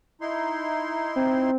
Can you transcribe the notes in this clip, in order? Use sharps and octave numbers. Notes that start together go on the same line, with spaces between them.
D#4 E4 C6
C4